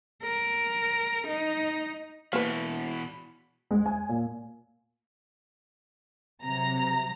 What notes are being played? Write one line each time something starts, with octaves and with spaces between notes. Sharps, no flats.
A#4
D#4
B2 E3 A#3 B4
G#3
G#5
A#2
C3 F#3 A#5